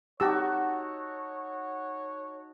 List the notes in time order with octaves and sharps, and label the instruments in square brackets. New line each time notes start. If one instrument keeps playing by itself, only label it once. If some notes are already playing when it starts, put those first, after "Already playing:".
[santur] D#4 F#4 A4 [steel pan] G4 E6 [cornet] C#5